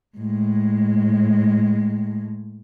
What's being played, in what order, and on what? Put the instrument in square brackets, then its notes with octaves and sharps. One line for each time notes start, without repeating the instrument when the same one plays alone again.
[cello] A2 G#3